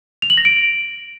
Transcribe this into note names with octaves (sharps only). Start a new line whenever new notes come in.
F7
F#7
A#6
D7